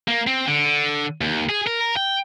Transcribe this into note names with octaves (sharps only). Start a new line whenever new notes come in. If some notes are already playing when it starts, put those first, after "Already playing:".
A#3
C4
D3
D#2
G#4
A#4
G5